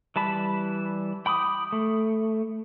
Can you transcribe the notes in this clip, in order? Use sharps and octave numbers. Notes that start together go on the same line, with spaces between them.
E3 G3 A5 B5
G5 B5 D6 D#6
A3